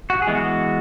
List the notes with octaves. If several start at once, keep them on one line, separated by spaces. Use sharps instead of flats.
F#4
G#4
E3 G#3 B3
F#4